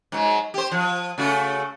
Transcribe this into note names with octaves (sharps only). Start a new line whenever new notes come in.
G#2 F#3
G4 C5
F3
C#3 A3 F#4